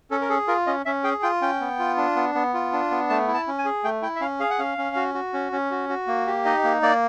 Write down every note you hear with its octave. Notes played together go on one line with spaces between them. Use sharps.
C#4 A4
A#4
G#4 A4
F4 A#4
C#4 D#5
C#4 E5
G#4 G5
F4 G5
C#4 G5
B3
F4
D4
B3
B3
F4
D4
B3
A3 A5
E4
A5
C#4
G#5
G#4
A3 G5
E4 G5
E5
C#4 F5
G#4 F5
F#5
C#4 F5
C#4
F#4
F#4
C#4
C#4
F#4
F#4
A#3
G4
D#4 D#5
A#3
A#3 D5